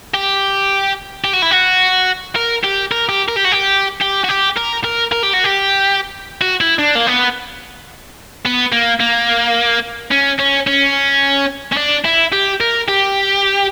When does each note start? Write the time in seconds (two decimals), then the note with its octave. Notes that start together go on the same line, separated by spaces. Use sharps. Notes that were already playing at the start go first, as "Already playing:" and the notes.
0.14 G4
1.24 G4
1.33 F#4
1.42 E4
1.51 F#4
2.36 A#4
2.64 G4
2.92 A#4
3.09 G4
3.29 A#4
3.36 G4
3.45 F#4
3.52 G4
4.02 G4
4.24 F#4
4.29 G4
4.57 A#4
4.84 A#4
5.12 A#4
5.23 G4
5.34 F#4
5.44 G4
6.41 F#4
6.61 E4
6.79 D4
6.95 A#3
7.07 B3
8.45 B3
8.72 A#3
9.00 A#3
10.11 C#4
10.39 C#4
10.67 C#4
11.72 C#4
11.77 D4
12.05 E4
12.32 G4
12.61 A#4
12.88 G4